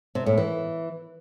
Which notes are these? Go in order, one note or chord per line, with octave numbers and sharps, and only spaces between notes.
C3
A2
E3